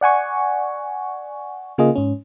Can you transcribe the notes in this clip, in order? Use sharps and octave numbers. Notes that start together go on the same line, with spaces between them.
D5 F#5 G#5 C#6
C#3 A#3 F4 G#4 D#5
G#2 C#4